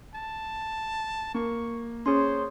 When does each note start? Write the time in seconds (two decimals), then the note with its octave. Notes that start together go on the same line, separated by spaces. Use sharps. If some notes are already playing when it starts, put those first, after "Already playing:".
0.14 A5
1.34 A#3 C#6
2.06 C#4 G#4 C5 C#5 C6